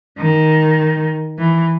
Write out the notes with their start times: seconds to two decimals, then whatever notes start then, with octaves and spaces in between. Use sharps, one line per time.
0.19 D#3
1.38 E3